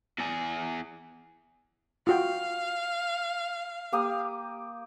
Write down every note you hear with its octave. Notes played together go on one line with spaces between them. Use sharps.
E2 G#4
F4 F#4 F5 G5
A#3 G4 D#6